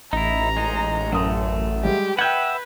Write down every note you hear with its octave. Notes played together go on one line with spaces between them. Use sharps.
A1 D#4 E4 A#5
G#3 D#4
F#2 F#3 A3 D#6
G3 G#3 G4
B4 E5 F#5 G5 G6 G#6